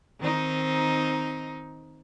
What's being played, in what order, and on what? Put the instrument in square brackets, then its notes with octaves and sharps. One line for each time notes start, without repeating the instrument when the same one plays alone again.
[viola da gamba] D#3 C4 D#4